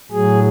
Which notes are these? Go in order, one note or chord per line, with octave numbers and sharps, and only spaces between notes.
A2 F#3 G#4